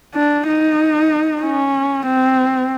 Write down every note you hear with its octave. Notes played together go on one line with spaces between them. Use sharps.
D4
D#4
C#4
C4